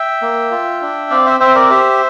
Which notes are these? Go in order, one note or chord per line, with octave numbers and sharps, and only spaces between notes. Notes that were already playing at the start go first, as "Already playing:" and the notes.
Already playing: E5 G5
A#3
F4
D4
C4 D5 F5
C5 E5
C4 C5 E5
A#4 D5
G4 C5 E5